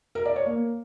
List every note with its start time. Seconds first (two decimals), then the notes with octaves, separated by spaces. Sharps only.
0.15 A#4
0.25 D5
0.36 C#5
0.46 A#3